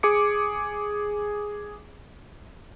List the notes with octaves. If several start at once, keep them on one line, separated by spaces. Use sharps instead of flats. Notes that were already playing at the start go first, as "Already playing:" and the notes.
G#4 D6 C#7